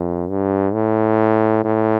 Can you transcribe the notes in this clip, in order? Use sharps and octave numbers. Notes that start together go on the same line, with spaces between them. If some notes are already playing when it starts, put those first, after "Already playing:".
Already playing: F2
G2
A2
A2